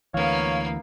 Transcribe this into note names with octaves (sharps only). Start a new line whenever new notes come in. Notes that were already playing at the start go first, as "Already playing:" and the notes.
D2 E3 A#3 B3 C#5 F5